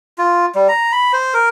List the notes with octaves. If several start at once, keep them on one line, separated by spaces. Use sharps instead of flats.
F4
G3
A#5
B5
C5
A#4